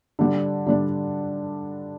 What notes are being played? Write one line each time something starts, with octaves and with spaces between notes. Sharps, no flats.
D3 G3 D4
D3 G3 D4